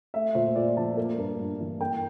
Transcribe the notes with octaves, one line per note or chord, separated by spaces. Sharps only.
A3 E5
A#2 C5
A#2 D5
F3 A5
A#3
G2
G2
E3
A#3 G5